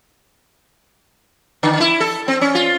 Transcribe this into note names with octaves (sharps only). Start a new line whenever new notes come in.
D3
E4
A4
C4
C#4
F4